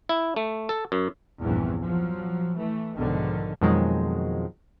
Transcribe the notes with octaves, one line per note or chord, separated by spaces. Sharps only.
E4
A3
A4
F#2
A#1 E2 G2 E3 C4 C#4
F3 F#3
E3 A3
B1 G#2 B2 D3 D#3 F3
F2 B2 D#3 F3 F#3 G#3